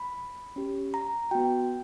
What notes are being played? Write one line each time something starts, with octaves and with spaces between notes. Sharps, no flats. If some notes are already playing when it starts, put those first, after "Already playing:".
Already playing: B5
C#4 G4
A#5
B3 F#4 G5